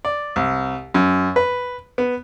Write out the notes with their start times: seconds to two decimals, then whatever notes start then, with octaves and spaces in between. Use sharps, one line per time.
0.05 D5
0.36 C2
0.94 F#2
1.36 B4
1.98 B3